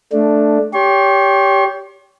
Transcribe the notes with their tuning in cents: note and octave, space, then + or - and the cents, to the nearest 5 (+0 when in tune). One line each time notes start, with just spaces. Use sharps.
A3 +0 D4 +5
G4 +0 C#5 +35 C6 +45